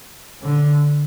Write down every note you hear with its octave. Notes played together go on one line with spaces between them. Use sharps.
D3